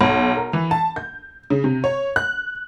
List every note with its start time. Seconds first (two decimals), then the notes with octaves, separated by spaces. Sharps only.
0.01 B1
0.37 A#4
0.53 E3
0.71 A5
0.96 G6
1.50 C#3
1.64 C3
1.84 C#5
2.16 F#6